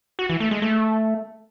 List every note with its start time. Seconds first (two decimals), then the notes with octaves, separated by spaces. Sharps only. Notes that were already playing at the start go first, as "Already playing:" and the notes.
0.19 F#4
0.30 E3
0.40 A3
0.51 G#3
0.62 A3